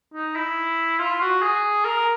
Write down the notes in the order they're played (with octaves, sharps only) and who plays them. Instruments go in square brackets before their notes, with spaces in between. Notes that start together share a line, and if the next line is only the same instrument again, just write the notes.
[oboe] D#4
E4
F4
F#4
G#4
A#4